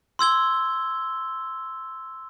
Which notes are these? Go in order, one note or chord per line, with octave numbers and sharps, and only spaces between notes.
C6 E6 G#6 G7